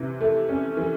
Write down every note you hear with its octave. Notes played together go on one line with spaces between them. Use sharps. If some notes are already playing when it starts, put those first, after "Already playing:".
Already playing: C3 E3
A3
C#4
E3